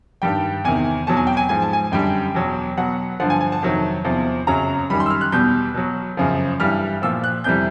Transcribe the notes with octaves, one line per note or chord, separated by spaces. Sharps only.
G2 D#3 G3 G5
E2 C3 D#3 G#5
E2 B2 F#3 A5
G#5
G5
G#5
G#2 F3 G#5
A5
G#5
F#2 D3 G3 G5
E2 B2 F#3
B2 F#3 F#5
G2 D3 F3 F#5
G#5
G#5
A5
F2 C3 D#3 F#3
E2 C3 F3
F#2 C#3 F#3 A#5
F#2 D#3 G3 B5
C6
E6
F6
F#6
E2 B2 G3 G6
B2 F#3
F#2 C#3 F3
G2 E3 G3 F6
A#2 F3 E6
F#6
F2 C3 E3 G3 G6